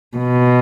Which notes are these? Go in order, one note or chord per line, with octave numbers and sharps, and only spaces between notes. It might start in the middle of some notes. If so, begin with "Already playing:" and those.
B2